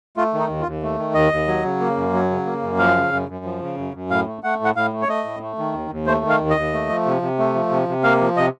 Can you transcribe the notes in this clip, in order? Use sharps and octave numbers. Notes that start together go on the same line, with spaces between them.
A3 F4
D#3
D#4
D#2
F4
D#2
A3
D#3
D#2 D#5
D#2
F#3
C#3
A#3
F#2
F#3
C#3
A#3
F#2
F3 F5
C#3
F#2
F#2
F3
C#3
F#2
F#2
A2 F5
A3
A3 F#5
A2
F#5
A2 F5
A3
C#5
A3 D#5
A2
A3
D#3
D#2
D#2
A3 C5
D#3
F5
D#2
D#5
D#2
A3
F3
C3
C3
A3
F3
C3
C3
A#3 F5
F3
C3 D#5